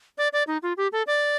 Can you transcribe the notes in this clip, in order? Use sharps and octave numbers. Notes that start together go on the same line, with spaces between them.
D5
D5
D#4
F4
G4
A4
D5